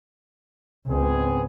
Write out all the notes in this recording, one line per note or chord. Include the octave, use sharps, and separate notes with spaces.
C#2 G#2 B3 C4 G#4